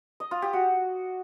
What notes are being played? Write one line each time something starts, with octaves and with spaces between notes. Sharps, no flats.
D#5
F4
G4
F#4